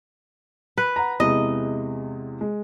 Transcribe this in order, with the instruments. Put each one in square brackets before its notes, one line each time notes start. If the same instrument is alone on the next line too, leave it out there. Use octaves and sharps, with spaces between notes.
[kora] B4
[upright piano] F#5 A#5
[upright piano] E2 C3 G#3 [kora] D#5
[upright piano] G#3